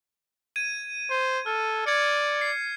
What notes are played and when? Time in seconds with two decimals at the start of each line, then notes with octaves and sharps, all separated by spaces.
0.56 G#6 D#7
1.10 C5
1.46 A4 F6
1.86 D5 G#6 C#7
2.41 C7